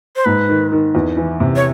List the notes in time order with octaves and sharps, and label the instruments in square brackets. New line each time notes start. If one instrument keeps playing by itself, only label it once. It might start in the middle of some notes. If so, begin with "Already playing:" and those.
[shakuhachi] C5
[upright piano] G#2 [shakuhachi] B4
[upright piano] D#3
D#3
E2
E3
C3
[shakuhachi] C#5